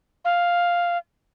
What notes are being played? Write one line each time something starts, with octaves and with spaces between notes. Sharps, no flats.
F5